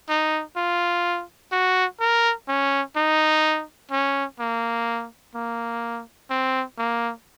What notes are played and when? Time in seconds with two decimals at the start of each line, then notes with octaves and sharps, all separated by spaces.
0.08 D#4
0.56 F4
1.52 F#4
2.00 A#4
2.48 C#4
2.96 D#4
3.91 C#4
4.39 A#3
5.35 A#3
6.30 C4
6.78 A#3